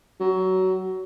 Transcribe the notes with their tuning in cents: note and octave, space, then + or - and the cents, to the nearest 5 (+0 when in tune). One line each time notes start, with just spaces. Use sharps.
F#3 +20